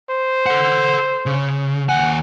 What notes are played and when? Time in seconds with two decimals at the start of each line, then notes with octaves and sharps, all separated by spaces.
0.10 C5
0.46 A4 F#5
1.26 C#3
1.89 D#2 F#5 G#5